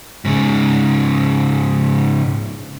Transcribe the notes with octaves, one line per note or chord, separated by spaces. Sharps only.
G#2 C#3